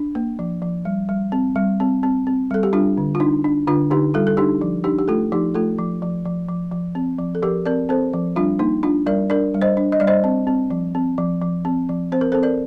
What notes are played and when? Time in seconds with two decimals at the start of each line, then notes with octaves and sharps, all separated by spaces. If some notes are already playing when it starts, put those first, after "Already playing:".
Already playing: D4
0.15 A#3
0.39 F3
0.62 F3
0.85 G3
1.09 G3
1.32 C4
1.56 G3
1.80 C4
2.03 C4
2.27 C4
2.51 G3 A4
2.63 G4
2.73 G3 D4 F4
2.98 D3
3.15 F4
3.20 D4 D#4
3.44 D4
3.67 D3 D4 F4
3.91 D3 D#4 G4
4.14 G3 F4 A4
4.27 A4
4.37 D4 D#4 G4
4.61 F3
4.84 D4 D#4 G4
4.98 G4
5.08 A3 F4 A4
5.32 F3 D#4 G4
5.54 A3 F4 A4
5.78 F3
6.02 F3
6.25 F3
6.49 F3
6.72 F3
6.95 C4
7.19 F3
7.35 A4
7.43 F3 G4 A#4
7.66 C4 A#4 D5
7.89 C4 A4 C5
8.13 F3
8.36 G3 D4 F4
8.59 A#3 D#4
8.83 D4 F4
9.06 G3 A#4 D5
9.30 D4 A#4 D5
9.54 G3
9.62 C5 D#5
9.77 D4
9.92 D#5
10.00 G3 D5
10.07 C5 D#5
10.24 C4
10.47 C4
10.70 F3
10.95 C4
11.18 F3
11.42 F3
11.65 C4
11.89 F3
12.12 C4 C5
12.21 A#4
12.32 A4 C5
12.35 C4
12.43 A#4 D5